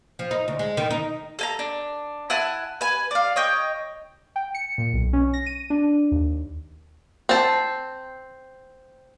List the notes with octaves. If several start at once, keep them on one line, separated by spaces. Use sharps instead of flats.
F3
D#4
D2
G#3
D#3
D#4
A4 G#5 A#5
D4
E4 F#5 G#5 A5
B4 G#5
D5 F5
C#5 D#5 G5
G5
C#7
A#2
B1
C#4
A#6
D#7
D4
D#2
C4 A5